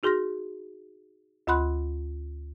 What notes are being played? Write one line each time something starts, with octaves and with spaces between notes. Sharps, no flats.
D#4 F#4 G#4 C6 F6 A#6
D2 F4 F#5 B5 C6 F#6